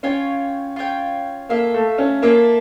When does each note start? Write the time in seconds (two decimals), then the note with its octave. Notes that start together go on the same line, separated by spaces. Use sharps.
0.03 C#4 F4 C#5 G5
0.76 F4 C#5 G5
1.49 A#3 F4 A4 E5
1.74 A3
1.98 C#4
2.22 A#3 F4 A4 E5